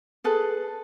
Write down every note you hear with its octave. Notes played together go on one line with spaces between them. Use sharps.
G#4 A4 B4